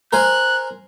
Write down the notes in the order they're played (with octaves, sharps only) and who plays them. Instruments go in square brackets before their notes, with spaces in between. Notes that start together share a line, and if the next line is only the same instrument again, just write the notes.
[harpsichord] A#4 C5 G#5 [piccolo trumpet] F#6